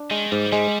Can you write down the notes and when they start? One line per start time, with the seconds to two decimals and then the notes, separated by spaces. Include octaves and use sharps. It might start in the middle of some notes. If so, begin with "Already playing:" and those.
Already playing: D4
0.11 D#3 G#3
0.31 G#2 G3
0.52 G3 G#3